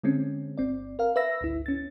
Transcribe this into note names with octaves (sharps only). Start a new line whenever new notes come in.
D3 G#3 C4 C#4
G1 C4 D5
A#4 F5
B4 E5 E6 A#6
G#1 D2 E4
C#4 A6